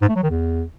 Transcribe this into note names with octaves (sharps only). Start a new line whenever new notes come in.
G#2
A3
F#3
D#3
E2